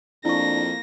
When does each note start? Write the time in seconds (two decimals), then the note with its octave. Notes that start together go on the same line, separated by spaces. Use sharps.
0.25 F2 A#3 D4 E4 C#6 A#6